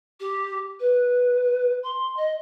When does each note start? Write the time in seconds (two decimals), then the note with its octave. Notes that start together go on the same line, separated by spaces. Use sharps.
0.20 G4
0.80 B4
1.83 C6
2.17 D#5